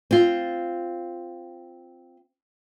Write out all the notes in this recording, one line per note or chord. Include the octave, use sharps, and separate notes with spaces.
C4 F4